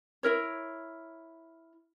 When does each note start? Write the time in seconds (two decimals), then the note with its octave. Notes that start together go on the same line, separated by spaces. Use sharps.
0.23 E4 A#4 C#5